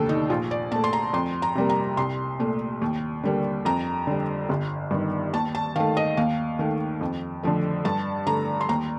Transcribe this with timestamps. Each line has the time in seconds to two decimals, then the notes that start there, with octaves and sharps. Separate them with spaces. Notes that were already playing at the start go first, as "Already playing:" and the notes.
Already playing: F1 D#2 D3 A4
0.09 D#4
0.30 A#1 F4
0.51 D5
0.71 A#2 A5
0.76 A3
0.84 C6
0.93 A#5
1.13 F2 C6
1.42 A#5
1.55 C3 G3 A#3
1.69 A#5
1.97 C2 C6
2.39 A#2 A3
2.82 D#2
3.24 D3 G3 A#3
3.65 F2 A#5
4.07 D3 G3
4.49 G1
4.91 G2 D#3
5.33 D#2 A5
5.55 A5
5.76 D#3 A3 F5
5.97 D#5
6.17 D#2 F5
6.59 D#3 A3
7.01 F2
7.43 D3 F3 A3
7.85 G2 A5
8.27 D3 A3 A#5
8.61 C6
8.69 D#2 A#5